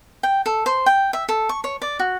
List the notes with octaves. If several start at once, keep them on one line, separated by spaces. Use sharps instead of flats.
G5
A4
C5
G5
E5
A4
C#6
C#5
D5
F#4